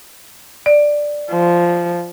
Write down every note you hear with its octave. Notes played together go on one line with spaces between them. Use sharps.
D5
F3